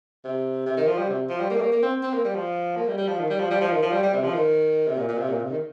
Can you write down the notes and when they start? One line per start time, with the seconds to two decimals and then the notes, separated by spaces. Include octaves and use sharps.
0.24 C3
0.66 C3
0.77 D#3
0.87 F3
0.98 G3
1.09 C3
1.29 F3
1.40 G3
1.50 A#3
1.56 G3
1.61 A#3
1.72 A#3
1.83 C4
2.03 C4
2.13 A#3
2.24 G3
2.35 F3
2.76 A#3
2.87 G3
2.98 G3
3.08 F3
3.19 D#3
3.30 G3
3.40 F3
3.50 G3
3.61 F3
3.72 D#3
3.82 F3
3.92 G3
4.03 G3
4.13 C3
4.24 F3
4.34 D#3
4.87 C3
4.98 A#2
5.09 A#2
5.18 C3
5.29 A#2
5.40 C3
5.50 D#3